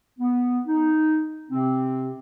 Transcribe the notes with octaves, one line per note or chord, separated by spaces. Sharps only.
B3
D#4
C3 C4